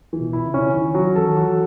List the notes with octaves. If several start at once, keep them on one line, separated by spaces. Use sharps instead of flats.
E3
B2
E4
C#3
C#4
D#3 C#4
F#3
E3 A4
D#3
E3 F#4